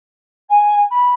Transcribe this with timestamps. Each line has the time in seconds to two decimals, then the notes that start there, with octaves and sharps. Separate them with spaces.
0.49 G#5
0.91 B5